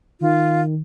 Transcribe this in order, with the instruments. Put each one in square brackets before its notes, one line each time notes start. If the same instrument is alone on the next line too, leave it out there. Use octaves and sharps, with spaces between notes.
[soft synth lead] D#3 [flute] F4